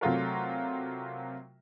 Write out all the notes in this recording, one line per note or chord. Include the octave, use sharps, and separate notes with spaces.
C3 F#3 A3 F4 F#4 A#4